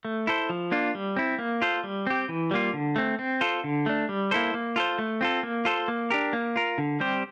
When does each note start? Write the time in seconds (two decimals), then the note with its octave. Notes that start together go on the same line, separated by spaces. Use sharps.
0.05 A3
0.27 E4 A4 C5
0.50 F3
0.71 A#3 D4 F4
0.95 G3
1.16 C4 E4
1.39 A#3
1.62 F4 A4 C5
1.84 G3
2.07 C4 G4
2.29 E3
2.51 G3 A#3 F4
2.73 D3
2.96 A3 C4
3.19 C4
3.41 F4 A4 C5
3.64 D3
3.86 A3 D4
4.09 G3
4.31 A#3 E4 A4 C5
4.54 A#3
4.76 F4 A4 C5
4.98 A3
5.21 C4 F4 A4
5.43 A#3
5.65 F4 A4 C5
5.88 A#3
6.10 D4 G4 A#4
6.33 A#3
6.56 F4 A#4
6.78 D3
7.00 G3 C4 G4 C5